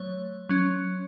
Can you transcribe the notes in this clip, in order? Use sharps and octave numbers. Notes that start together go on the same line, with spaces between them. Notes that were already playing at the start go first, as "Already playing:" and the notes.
Already playing: F#3 A3 C#5
F#3 C#4